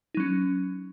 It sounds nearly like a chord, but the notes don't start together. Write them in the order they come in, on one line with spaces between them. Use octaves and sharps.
D#4 F#3 C#4